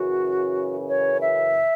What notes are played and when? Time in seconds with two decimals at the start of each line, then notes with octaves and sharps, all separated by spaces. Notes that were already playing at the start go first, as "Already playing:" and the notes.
Already playing: F#2 C#3 E3 F#4
0.87 C#5
1.19 E5